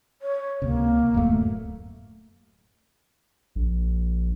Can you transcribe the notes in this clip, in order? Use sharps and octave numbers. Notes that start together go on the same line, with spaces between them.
C#5
C#2 C3 A#3
D1 F#2 A3
A#1